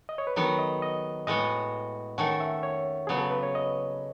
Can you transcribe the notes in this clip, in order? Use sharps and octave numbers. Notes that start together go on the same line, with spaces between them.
D#5
C#5
B4
D#3 F#3 B3 A4
D#5
D#5
A2 G#3 B3 F#4 D#5
D#3 A3 C#4 F#5
E5
C#5
C#3 F#3 B3 G#4
A4
B4
C#5
D#5